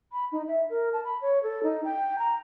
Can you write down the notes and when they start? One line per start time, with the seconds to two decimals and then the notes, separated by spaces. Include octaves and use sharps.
0.12 B5
0.32 D#4
0.48 E5
0.70 A#4
0.93 A5
1.04 B5
1.22 C#5
1.43 A4
1.63 D#4
1.84 G5
2.19 A#5